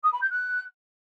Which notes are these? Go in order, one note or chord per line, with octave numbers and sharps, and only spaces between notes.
D#6
B5
G6
F#6